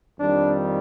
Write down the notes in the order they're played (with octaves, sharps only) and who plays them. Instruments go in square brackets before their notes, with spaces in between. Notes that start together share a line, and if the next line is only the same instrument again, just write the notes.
[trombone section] F2 D#3 G3 D4